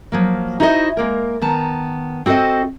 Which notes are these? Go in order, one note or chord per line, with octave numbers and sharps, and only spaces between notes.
F3 F#3 A#3
D#4 E4 F#4 C5 D5 D#5
G#3 A#3 A#4
D#3 B3 A5 A#5
C4 F#4 A4 C5 D#5